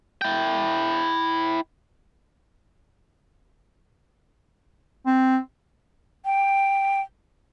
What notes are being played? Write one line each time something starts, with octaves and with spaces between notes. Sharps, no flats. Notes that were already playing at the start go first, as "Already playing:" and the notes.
E4 G5
C4
G5